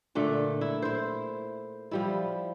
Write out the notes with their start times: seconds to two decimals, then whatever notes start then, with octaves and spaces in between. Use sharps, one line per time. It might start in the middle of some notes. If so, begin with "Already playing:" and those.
0.15 A#2 D3 A3
0.61 E4
0.82 E4 C5
1.91 F3 G3 E4